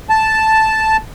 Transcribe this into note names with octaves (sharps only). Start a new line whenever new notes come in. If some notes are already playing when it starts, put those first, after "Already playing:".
A5